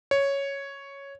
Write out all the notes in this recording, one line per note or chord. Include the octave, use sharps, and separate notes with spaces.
C#5